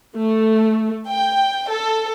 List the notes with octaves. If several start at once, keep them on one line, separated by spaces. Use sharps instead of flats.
A3
G5
A4